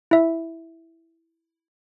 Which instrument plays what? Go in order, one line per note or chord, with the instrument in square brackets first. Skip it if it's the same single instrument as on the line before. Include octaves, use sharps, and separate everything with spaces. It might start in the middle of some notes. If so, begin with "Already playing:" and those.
[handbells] E4 E5